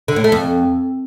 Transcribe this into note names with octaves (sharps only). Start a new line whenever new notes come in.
D3
A2
A3
F2